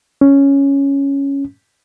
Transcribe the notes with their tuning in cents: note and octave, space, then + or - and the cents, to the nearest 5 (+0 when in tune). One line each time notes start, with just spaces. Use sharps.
C#4 +0